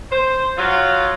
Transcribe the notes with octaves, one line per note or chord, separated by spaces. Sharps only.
C5
F#3 F4